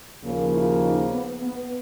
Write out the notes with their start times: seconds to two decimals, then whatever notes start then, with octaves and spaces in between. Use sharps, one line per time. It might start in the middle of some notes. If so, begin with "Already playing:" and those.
0.23 D#2 C#3 F3 A#3
0.53 E4
0.83 D#4
1.13 B3
1.43 B3